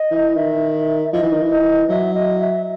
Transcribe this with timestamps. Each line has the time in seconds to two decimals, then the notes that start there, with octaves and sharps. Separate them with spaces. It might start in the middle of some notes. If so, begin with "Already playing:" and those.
Already playing: D#5
0.11 E3
0.36 D#3 E5
1.13 F3 D#5
1.23 E3
1.33 D#3
1.42 E3
1.51 D#5
1.89 F#3 E5
2.14 D#5
2.40 E5